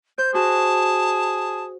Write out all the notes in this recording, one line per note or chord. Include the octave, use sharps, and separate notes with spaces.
C5 G6
F#4 G#4 A5